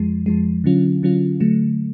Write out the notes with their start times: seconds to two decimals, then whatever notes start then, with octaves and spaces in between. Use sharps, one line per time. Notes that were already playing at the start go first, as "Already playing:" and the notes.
Already playing: F2 F3 G#3
0.26 F2 F3 G#3
0.64 D3 F#3 C#4 F4
1.03 D3 F#3 C#4 F4
1.40 D3 F#3 A3